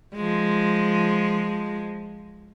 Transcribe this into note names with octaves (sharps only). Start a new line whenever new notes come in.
F3 G#3